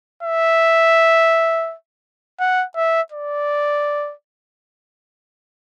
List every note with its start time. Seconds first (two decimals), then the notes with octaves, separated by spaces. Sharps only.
0.23 E5
2.39 F#5
2.76 E5
3.12 D5